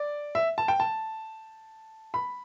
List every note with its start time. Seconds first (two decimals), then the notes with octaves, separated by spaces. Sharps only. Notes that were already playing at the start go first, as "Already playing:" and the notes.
Already playing: D5
0.35 E5
0.58 A5
0.68 G5
0.80 A5
2.14 B5